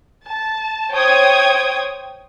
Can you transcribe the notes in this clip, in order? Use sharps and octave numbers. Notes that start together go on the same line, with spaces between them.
A5
C5 C#5 G5 D#6 G#6